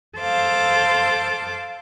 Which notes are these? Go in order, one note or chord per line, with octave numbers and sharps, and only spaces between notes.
A4 C5 F5 D6